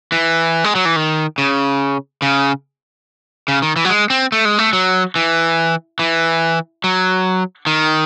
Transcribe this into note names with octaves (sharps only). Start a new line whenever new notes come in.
E3
G#3
F#3
E3
D#3
C#3
C#3
C#3
D#3
E3
F#3
G#3
C4
A3
G#3
A3
F#3
E3
E3
F#3
D#3